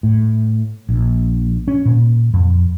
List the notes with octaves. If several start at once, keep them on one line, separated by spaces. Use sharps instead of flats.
A2
A#1
C#4
A#2
F2